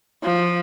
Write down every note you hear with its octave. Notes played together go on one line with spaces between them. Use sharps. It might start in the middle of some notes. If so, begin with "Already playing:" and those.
F3